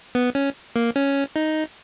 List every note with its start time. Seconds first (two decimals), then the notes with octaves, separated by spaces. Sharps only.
0.15 B3
0.35 C#4
0.76 A#3
0.96 C#4
1.36 D#4